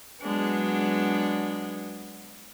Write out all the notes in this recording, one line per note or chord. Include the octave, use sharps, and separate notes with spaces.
F#3 G#3 B3 D4